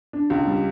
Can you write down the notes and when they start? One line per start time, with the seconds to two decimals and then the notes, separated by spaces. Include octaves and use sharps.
0.13 D4
0.30 C#2
0.47 G3